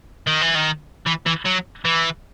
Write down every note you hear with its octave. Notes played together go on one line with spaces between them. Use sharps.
D#3
E3
D#3
E3
E3
F#3
E3